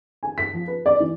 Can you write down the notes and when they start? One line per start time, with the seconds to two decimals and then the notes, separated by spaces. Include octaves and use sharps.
0.23 G#5
0.38 B6
0.53 F3
0.67 B4
0.86 D5
1.00 E3